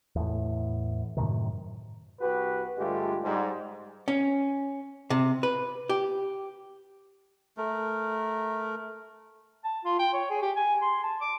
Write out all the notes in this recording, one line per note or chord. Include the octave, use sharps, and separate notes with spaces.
E2 A2
F#2 A2 C3 D#3
C2 F#4 G4 B4
G2 D3 G#3 A3 F4 G4
G#2 G3
C#4
C3
B4
G4
A3 A#4
A5
F4
G5
C#5
G#4
G4
G#5
C6
A5
D6